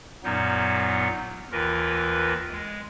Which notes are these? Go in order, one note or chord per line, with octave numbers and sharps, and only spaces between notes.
F#2 A#2 F#3 B3 D#4
D#2 E3 F4 A#4 B4 A#6
G#3